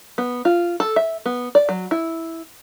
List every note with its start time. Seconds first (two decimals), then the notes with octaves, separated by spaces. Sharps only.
0.18 B3
0.45 F4
0.80 A4
0.96 E5
1.26 B3
1.55 D5
1.69 F#3
1.91 E4